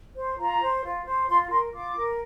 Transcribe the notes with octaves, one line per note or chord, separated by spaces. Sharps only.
C5
F4 A#5
C5
F4
C5
F4 C6
A#4 C6
F4 D6
A#4